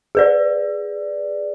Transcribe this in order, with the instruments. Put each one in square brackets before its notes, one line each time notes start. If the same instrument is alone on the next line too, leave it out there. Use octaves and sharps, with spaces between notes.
[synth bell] G#4 B4 D5